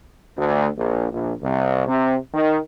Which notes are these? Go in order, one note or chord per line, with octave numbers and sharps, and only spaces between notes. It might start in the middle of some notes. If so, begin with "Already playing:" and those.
D2
A#1
A#1
C2
C3
D#3